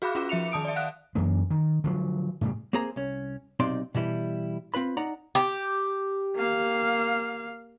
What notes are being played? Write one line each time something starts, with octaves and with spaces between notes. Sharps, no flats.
F#4 G#4 F5 B5 D6 F#6
C#4 F4 D6 E7
F3 E5 C#7 F7
D#3 A5 D#6 D7
D5 E5
F5 F#5 F#6 D7
F#2 E3 A#3
D#3
D3 F3 F#3
A2 C#3 G3
A#3 C4 G#4 C5 A#5
C2 C#4
B1 C3 C4 D#4 D5 C6
B2 E3 G3 E4
C4 F4 B4 B5
D#4 D5 F#5 A#5
G4
A#3 F5